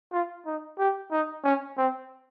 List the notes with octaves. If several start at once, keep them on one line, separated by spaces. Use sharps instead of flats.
F4
D#4
G4
D#4
C#4
C4